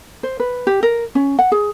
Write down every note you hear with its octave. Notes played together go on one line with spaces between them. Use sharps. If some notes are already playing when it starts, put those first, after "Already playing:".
C5
B4
G4
A#4
C#4
F#5
G#4